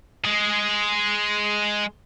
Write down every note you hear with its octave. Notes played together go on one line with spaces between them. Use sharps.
G#3 G#4